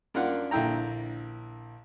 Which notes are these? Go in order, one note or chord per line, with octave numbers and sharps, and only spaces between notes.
F#2 A#3 D4 F4 F#5
A#1 D3 E4 G5 A#5